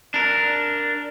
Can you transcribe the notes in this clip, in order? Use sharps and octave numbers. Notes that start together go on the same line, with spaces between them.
D4 A#4